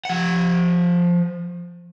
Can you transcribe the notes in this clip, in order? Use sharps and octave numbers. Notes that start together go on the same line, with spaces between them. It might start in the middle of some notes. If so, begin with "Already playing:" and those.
F3 F#5